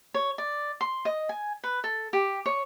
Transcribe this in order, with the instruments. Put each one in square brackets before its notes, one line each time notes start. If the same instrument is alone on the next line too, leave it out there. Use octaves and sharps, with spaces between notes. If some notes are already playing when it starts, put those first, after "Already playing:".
[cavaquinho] C#5
D5
C6
D#5
G#5
B4
A4
G4
C#5